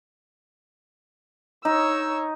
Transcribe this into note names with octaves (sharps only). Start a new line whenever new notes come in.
D#4 C#5 E6